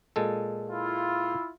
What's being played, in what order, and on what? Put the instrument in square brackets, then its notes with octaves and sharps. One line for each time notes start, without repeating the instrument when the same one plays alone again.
[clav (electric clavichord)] A#2 G#3 A4
[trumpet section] E4 F4